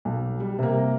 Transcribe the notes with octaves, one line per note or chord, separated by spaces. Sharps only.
B1
G3
C3 A#3